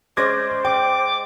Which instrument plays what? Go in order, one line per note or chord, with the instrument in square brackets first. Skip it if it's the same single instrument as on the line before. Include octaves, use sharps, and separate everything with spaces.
[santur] G#3 C#4 D5 [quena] C5 [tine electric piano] D6 G#6 A#6
[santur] D5 [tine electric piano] G5 [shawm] D6